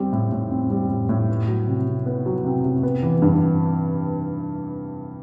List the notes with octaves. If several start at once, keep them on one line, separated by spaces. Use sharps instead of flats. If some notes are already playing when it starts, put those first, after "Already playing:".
Already playing: G3 C4
A2
A2
C4
G3
A2
A2
B3
F#3
C3
C3
B3
F#3
C3
C3
B3
E3
G2